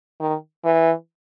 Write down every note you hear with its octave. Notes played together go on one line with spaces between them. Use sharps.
D#3
E3